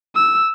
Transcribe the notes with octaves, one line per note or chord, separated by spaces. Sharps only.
E6